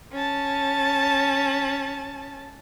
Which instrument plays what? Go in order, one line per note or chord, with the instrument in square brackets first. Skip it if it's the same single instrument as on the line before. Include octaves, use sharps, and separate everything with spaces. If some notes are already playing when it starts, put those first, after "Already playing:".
[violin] C#4 A5